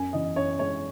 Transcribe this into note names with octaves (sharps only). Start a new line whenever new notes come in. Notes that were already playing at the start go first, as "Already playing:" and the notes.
Already playing: F#2 G#5
E3 D#5
F#2 C#5
G#3 C#5